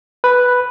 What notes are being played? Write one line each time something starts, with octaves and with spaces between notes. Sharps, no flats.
B4